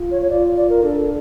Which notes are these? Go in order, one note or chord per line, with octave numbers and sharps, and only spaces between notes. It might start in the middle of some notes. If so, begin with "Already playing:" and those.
Already playing: F4
C#5
C#5
F4 D5
D5
A#4
D4 A4